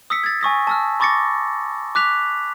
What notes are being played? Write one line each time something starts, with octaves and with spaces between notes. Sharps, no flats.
D#6 E6 B6 C#7
G#6 A6
G#5 C#6 D#6 A#6
A5 E6 F6
B5 C#6 D6 A6 A#6 C#7
D6 F#6 B6 F7